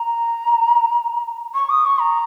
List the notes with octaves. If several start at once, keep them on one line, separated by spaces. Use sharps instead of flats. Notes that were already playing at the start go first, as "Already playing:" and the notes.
Already playing: A#5
C#6
D#6
C#6
A#5